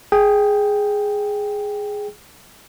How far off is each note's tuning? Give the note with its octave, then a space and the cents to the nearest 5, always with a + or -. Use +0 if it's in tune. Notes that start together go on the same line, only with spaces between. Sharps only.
G#4 +0 G5 +0